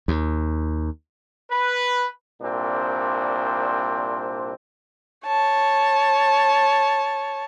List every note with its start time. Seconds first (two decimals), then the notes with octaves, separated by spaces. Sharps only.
0.08 D#2
1.50 B4
2.41 C2 A#2 C4 D4 C5
5.26 C#5 A5